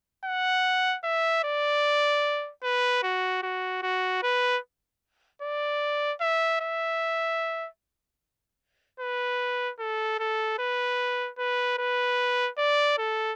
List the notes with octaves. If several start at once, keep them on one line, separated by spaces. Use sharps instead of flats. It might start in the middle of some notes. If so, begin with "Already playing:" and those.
F#5
E5
D5
B4
F#4
F#4
F#4
B4
D5
E5
E5
B4
A4
A4
B4
B4
B4
D5
A4